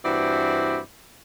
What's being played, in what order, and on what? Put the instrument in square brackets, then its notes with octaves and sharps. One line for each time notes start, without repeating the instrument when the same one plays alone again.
[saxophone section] G2 E3 C4 E4 F#4 D5